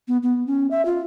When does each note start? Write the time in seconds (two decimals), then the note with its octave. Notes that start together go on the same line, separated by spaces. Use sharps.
0.08 B3
0.23 B3
0.47 C#4
0.71 E5
0.85 F4